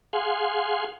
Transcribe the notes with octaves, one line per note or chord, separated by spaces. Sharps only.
G#4 F5 F#5 G#5 C6